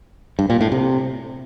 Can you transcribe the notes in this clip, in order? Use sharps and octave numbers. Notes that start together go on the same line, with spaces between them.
G2
A#2
A2
C3